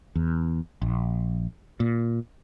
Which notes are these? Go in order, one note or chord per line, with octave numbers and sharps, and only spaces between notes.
E2
A#1
A#2